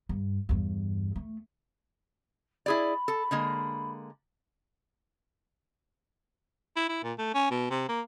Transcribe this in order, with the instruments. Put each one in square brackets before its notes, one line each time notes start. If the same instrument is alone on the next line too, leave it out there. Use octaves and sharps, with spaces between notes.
[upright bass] G2
E2 G2
A3
[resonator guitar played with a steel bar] E4 G#4 D5 [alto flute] B5
[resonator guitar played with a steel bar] A4
D3 G#3 A#3
[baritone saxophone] E4
E4
A#2
A3
C#4
B2
C3
A#3